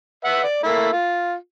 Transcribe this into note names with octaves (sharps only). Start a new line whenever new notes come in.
B4 E5 F#5
D5
A3 A#3 E4
F4